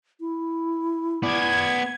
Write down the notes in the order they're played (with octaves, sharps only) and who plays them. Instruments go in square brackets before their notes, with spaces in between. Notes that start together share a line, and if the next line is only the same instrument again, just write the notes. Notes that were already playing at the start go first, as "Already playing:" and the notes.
[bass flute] E4
[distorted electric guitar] B3 D5 [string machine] G#6